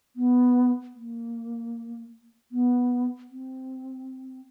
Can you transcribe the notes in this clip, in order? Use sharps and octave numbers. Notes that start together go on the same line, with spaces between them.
B3
A#3
B3
C4